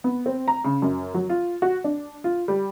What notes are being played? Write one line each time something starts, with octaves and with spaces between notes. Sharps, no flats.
B3
C4
A#5
C#3
F#2
F#3
F4
F#4
D4
F4
G3